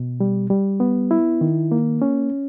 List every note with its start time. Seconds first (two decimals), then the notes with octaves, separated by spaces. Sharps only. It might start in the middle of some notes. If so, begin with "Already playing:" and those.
Already playing: B2
0.20 G3
0.50 G3
0.80 B3
1.11 E4
1.41 D#3
1.72 A#3
2.02 C#4